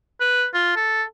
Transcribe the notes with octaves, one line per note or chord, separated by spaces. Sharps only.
B4
F4
A4